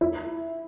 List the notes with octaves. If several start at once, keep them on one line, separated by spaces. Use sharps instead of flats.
E4